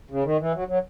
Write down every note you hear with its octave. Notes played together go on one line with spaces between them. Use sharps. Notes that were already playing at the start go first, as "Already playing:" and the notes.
C#3
D#3
E3
F#3
F#3